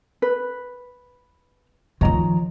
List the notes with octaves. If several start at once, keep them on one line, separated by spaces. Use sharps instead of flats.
B4
D#3 F3 C#5 D#5 A#5